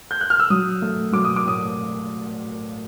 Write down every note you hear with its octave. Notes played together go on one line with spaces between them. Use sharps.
G6
F#6
F6
E6
F#3 D#6
A3
F#3 D6
D#6
D6
A2 D#6